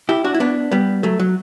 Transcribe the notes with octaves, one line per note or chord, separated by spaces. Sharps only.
E4 G4
D4 F#4
E4
B3 D4
G3 B3
F#3 A3
F#3